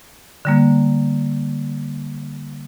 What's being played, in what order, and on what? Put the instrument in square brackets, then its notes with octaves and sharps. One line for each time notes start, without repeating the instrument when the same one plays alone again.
[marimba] D3 G3 A#3